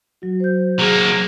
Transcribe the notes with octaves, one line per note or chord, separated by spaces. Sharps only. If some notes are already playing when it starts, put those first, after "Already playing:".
F#3 F#4
C5 G6
F#3 A#3 G#4